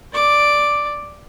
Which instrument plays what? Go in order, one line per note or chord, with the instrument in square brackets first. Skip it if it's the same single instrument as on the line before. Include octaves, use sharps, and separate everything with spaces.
[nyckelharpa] D5 D6